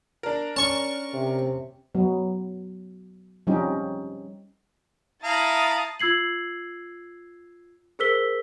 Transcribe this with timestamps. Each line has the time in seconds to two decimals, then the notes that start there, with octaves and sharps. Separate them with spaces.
0.23 D4 A#4
0.56 C#4 A5 C#6
1.14 C3
1.94 F#3 B3
3.47 F3 G3 C4 C#4 D#4 G4
5.24 E4 F5 A5 A#5 D#6
6.00 F4 E6 G#6 C7 F#7
7.99 G#4 A#4 C5 E6 B6 G7